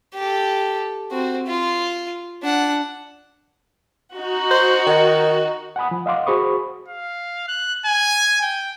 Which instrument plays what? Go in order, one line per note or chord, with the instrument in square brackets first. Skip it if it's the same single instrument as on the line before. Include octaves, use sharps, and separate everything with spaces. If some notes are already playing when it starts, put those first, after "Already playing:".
[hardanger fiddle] G4 A4
C4 F#4
F4
D4 F#5
[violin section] D#4 F#4
[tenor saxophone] C5
D#3
[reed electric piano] F#5 G#5 B5 D#6
F3
D#5 F5 F#5 C6 D6
F#4 G#4 C5 B5 C#6 D#6
[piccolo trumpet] F5
F#6
G#5
G5